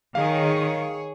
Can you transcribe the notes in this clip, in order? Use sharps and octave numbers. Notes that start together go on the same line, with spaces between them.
D#3 G#4 C#5 F5